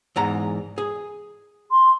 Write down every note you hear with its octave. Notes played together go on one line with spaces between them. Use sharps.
E2 G#2 A#5
G#4
C6